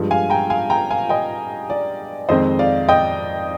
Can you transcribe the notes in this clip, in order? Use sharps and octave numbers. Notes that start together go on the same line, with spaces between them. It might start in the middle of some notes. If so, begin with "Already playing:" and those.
Already playing: G2 F3 G#3
F5 G#5
G5 A#5
F5 G#5
G5 A#5
F5 G#5
D#5 G5
D5
F2 D#3 G#3 C4 C5 D#5
D5 F5
D#5 G5